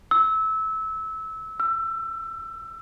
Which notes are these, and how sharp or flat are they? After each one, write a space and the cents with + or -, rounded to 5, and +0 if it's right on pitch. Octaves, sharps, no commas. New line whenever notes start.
E6 -20
E6 +25